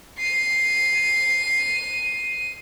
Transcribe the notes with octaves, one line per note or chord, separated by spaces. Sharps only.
C7 D#7